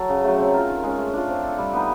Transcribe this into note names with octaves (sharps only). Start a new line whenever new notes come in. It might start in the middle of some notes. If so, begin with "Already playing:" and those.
Already playing: F#3 A4
C#3
F#3 A3
C4
F4 A#4
D#3
G#3 C#4
A3
D4 F4
C4
F4 A4
G3
B3 D#4